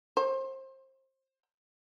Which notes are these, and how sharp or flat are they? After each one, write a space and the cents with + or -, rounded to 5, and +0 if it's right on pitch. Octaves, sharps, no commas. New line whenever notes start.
C5 +25